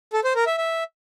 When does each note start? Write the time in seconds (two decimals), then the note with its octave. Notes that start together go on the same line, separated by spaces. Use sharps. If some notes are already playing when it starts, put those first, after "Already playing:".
0.13 A4
0.24 C5
0.35 A#4
0.46 E5
0.58 E5